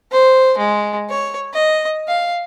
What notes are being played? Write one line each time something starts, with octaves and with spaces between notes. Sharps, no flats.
C5
G#3
C#5
D#5
F5